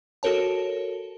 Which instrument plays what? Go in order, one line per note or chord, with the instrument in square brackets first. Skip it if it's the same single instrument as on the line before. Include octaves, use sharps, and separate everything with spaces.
[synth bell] F#4 A4 A#4 C#5 A5